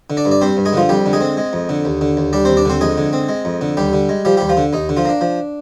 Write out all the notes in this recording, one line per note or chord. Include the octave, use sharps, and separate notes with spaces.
D3
D4 D5
G2
D5
G3 C4 C5
G2
G#3 G#4
D3 F3 F4
F2 G3 G4
D3
G#3 G#4
C4
G#3
F2
D3
D#2
D3
D#2
G3 D4 D5
D#2 C4 C5
D4 D5
D3 C4 C5
F2 G#3 G#4
D3
C4
G#3
F2
D3
D#2 G3 G4
D3
G#3
F3 G3 G4
D#2 G3 G4
F3 F4
D3
D#2 D#4
D3
F3 F4
A#3 D4
F3